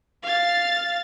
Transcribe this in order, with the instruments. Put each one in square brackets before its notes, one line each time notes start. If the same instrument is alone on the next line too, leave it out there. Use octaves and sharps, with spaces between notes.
[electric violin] F5 A6